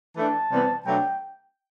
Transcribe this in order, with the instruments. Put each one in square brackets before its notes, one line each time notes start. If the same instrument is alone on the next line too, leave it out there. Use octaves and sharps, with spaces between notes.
[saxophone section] E3 A3 D4 [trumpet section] A5
[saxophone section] C3 E3 G3 B3
[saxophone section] B2 F#3 A3 D4 [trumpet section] G5